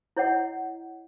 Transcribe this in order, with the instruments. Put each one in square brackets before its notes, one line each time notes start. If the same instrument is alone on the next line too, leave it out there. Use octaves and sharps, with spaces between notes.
[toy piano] E4 C#5 D#5 F#5